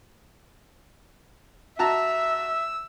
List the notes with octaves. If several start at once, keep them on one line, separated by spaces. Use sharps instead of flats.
F#4 E5 A5 A#5 E6